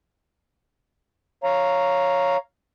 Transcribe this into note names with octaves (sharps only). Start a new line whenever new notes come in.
C#5 F5 A#5